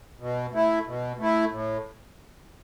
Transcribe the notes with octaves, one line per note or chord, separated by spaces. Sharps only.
B2
A3 E4
B2
A3 E4
A2